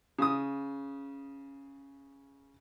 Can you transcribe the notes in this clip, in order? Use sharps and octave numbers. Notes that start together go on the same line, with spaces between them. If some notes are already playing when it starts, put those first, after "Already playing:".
C#3 D#6